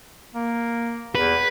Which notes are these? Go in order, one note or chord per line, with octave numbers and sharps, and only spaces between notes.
A#3
E2 B4